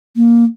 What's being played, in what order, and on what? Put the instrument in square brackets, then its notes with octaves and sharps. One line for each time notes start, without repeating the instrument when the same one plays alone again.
[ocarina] A#3